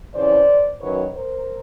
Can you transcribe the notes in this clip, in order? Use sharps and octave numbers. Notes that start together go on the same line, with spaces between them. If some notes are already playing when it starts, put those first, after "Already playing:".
F2 C#3 E3 C5 D5
F#2 D#3 F#3 B4 C#5
A#4 C5